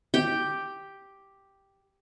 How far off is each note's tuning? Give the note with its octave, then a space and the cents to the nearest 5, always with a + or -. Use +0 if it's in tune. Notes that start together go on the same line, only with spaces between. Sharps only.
G4 +0 G5 +0